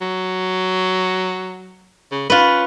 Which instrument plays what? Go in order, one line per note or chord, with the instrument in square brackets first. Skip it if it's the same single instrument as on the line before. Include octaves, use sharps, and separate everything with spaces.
[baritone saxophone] F#3
C#3
[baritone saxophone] C#4 [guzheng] F4 B4